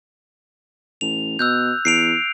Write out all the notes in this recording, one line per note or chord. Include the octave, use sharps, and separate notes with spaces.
A1 F7
B2 E6 F#6 G6
E2 C7 D7 F7